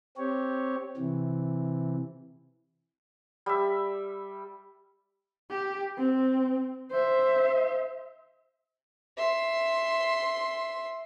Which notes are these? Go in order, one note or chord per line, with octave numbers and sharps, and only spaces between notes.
C4 G4 C#5
C3 E3
G3 E5
G4
C4
C5 E5
E5 C6